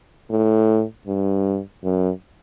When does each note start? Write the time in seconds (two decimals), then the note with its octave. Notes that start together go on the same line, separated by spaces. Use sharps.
0.30 A2
1.07 G2
1.84 F#2